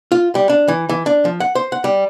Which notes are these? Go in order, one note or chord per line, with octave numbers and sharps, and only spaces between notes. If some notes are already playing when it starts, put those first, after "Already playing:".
F4
G3
D4
E3
E3
D4
F3
F#5
C5
F#5
G3